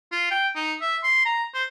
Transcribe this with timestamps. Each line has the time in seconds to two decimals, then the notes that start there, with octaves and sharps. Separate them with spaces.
0.12 F4
0.31 G5
0.56 D#4
0.81 E5
1.03 C6
1.25 A#5
1.54 C5